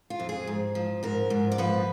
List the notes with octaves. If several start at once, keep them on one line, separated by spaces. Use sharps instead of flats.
F4
F2
G#4
G#2
F3
G#2 A#4
G#2
D5
F3 B4